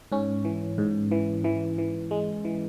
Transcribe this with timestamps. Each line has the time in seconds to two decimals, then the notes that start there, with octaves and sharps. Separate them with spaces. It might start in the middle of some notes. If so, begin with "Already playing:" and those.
0.12 G#2 C#4
0.45 E3
0.78 G#2
1.12 E3
1.44 E3
1.78 E3
2.11 G#3
2.45 E3